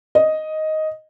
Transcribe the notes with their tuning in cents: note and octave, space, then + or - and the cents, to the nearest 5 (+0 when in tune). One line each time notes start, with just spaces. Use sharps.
D#5 +5